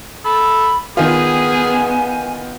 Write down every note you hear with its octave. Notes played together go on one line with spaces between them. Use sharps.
A4 B5
D#3 B3 F4 G#4 G#5